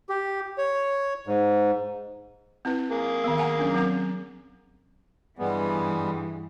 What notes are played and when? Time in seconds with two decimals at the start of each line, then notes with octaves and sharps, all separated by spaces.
0.09 G4
0.58 C#5
1.27 G#2
2.65 C4 E4 B4
2.91 A#3 G#4
3.24 D#3 B3
3.38 F#5 G#5 A#5
3.59 F#3 C#4 D4
3.74 F#3 C4 A#5
5.39 G2 E3 G3 G#3 B3